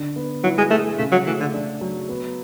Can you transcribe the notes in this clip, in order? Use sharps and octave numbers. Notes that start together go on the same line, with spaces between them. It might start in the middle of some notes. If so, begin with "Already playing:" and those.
Already playing: D3
B3
F#3 E4
G#3
G#3 A3
C#3 A3
F#3
E3 A3
D3
D4
F#3
B3